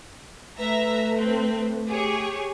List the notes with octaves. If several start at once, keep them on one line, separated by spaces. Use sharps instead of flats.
A3 B4 E5 A#5
C4
G4 G#4 C#5